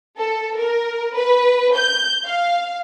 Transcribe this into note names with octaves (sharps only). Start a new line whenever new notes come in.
A4
A#4
B4
G6
F5